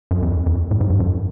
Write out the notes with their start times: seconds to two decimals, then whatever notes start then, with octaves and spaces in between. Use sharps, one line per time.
0.11 F#2
0.23 F2
0.46 F2
0.71 A2
0.81 G#2
0.90 G2
1.00 F#2